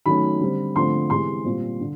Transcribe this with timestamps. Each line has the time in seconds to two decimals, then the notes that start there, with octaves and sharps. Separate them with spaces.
0.06 D#3 F#3 A3 C#4 B5
0.40 D3 G3 C4
0.76 D3 F3 A3 C4 C6
1.10 C3 E3 G#3 C6
1.45 A#2 G3 C4
1.80 D3